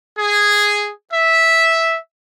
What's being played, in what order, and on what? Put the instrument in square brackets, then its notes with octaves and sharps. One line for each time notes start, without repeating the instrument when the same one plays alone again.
[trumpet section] G#4
E5